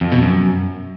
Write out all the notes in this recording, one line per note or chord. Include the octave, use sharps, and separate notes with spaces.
F2
B2
F#2